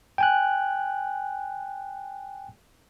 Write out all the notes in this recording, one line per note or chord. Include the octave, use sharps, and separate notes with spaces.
G5 G#5 F#6